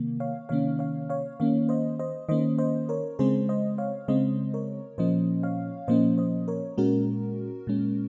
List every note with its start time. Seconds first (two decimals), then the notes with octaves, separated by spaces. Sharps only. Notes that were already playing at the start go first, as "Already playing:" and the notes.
Already playing: C3 D#3 A#3
0.20 C#5 F5
0.49 C3 D#3 A#3 C#4 C#5 F5
0.79 C#5 F5
1.09 C#5 F5
1.40 D#3 A#3 C#4 C#5 F5
1.69 C5 D#5
1.99 C5 D#5
2.29 D#3 A#3 C#4 C5 D#5
2.58 C5 D#5
2.89 A#4 C#5
3.19 C#3 G#3 C4 G#4 C5
3.49 C5 D#5
3.78 C#5 F5
4.08 C#3 G#3 C4 C5 D#5
4.54 A#4 C#5
4.98 A#2 F3 A#3 C#4 C5 D#5
5.43 C#5 F5
5.88 A#2 F3 A#3 C#4 C5 D#5
6.18 C5 D#5
6.48 A#4 C#5
6.78 A#2 G#3 C#4 F#4 A#4
7.67 A#2 G#3 C#4